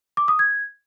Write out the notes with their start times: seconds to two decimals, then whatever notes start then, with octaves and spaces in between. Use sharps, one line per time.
0.17 D6
0.28 D#6
0.39 G#6